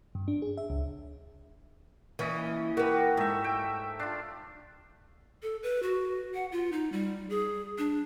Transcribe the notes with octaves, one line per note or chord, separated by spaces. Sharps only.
G2
D4
G#4
E5
C#2
A#2 E3 C#4 D#5
F#4 G4 A#4 B4
G#2 A3 E5
G5
D4 F4
A4
B4
F#4
F#5
F4
D#4
G3
G#4
D4